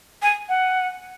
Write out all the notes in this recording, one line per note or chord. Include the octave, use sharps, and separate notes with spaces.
G#5
F#5